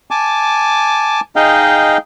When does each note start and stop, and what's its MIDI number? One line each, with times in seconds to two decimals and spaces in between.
0.11 1.20 80
0.11 1.20 81
0.11 1.20 86
1.36 1.97 63
1.36 1.97 68
1.36 1.97 75
1.36 1.97 77
1.36 1.97 79